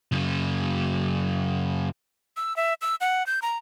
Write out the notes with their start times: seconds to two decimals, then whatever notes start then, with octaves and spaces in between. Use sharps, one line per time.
0.12 F#2 C#3
2.37 E6
2.57 E5
2.82 E6
3.01 F#5
3.27 G6
3.42 A#5